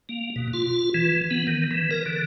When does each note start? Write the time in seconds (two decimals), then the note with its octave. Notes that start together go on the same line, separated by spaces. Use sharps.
0.09 A#3
0.36 B2
0.53 F4
0.94 E3
1.31 B3
1.47 D#3
1.71 E3
1.91 A#4
2.06 D3